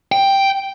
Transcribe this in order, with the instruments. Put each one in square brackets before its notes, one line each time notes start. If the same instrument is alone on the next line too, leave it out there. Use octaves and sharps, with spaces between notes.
[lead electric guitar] G5